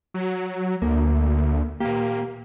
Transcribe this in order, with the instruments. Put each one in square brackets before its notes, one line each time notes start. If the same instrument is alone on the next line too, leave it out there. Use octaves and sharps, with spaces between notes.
[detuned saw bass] F#3
[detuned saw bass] D2 [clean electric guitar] A#3
[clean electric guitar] A#2 G4 [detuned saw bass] A#3